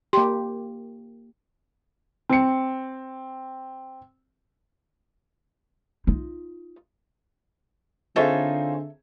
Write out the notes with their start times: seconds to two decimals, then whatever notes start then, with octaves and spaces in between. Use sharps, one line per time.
0.13 A#3 G4 C6
2.29 C4 C#7
6.07 D#4 F4
8.16 D3 C4 D#4 F4 G#4 A4 C#5 E5